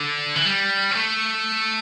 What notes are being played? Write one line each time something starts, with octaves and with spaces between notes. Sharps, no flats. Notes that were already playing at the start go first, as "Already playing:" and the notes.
Already playing: D3
E3
G3
C4
A3